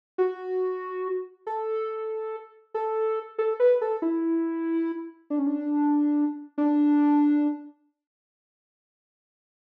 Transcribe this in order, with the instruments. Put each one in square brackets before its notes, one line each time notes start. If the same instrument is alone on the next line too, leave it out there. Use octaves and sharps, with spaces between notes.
[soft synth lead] F#4
A4
A4
A4
B4
A4
E4
D4
C#4
D4
D4